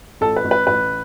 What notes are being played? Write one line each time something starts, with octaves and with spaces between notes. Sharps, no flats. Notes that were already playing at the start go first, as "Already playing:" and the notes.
A1 A4
B4
A1
B4
A1 B4